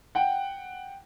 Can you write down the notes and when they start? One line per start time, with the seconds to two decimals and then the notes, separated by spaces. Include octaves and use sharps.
0.15 F#5 G5